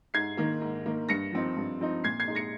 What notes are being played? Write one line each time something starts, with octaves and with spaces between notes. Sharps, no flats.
G#2 G#6 C7
D#3 A#3
G#2
D#3 A#3
G2 A#6 C#7
F3 C4 D#4
G2
F3 C4 D#4
A#2 G#6 C7
G#6 C7
G#3 D#4
A#6 C#7